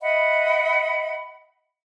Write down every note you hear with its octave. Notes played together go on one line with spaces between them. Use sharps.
D#5 E5 F#5 B5